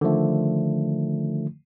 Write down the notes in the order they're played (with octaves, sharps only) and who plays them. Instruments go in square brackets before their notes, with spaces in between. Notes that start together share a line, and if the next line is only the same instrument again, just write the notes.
[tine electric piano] D3 D#3 F3 A3